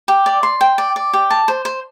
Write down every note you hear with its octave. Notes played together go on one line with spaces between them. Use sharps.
G4
D5
C6
G5
D5
D5
G4
A5
C5
C5